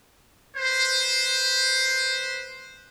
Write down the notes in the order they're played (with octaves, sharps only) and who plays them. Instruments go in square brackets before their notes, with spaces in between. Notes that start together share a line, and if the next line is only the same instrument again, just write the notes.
[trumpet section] B4 C5